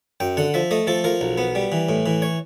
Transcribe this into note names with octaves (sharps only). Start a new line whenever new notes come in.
F#2 G5
D3 F#5
F3 E5
A3 D#5
F3 A4
F3 A#4
B1
B3
G3
E3
A2
E3
C#5